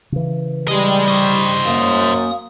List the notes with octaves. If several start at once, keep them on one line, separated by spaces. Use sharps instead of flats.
C#3 E3
G3 G#3 D#5
C5 D#5 C#6
F#2 A#3 D#6